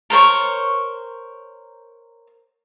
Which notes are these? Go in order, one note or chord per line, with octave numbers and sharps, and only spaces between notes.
A#4 C5 C#5 C#6